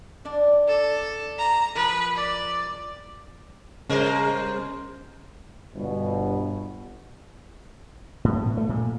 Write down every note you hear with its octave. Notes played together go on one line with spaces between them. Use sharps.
D4 D5
A4
A#5
F3 A#4 B4
D5
C#3 G3 A#4 C5
G1 G2 B2
A2
B2
A3
A#2